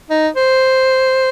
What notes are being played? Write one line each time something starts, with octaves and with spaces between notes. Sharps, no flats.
D#4
C5